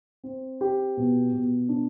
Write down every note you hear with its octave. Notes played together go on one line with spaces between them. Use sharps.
C4
G4
B2
B2
D4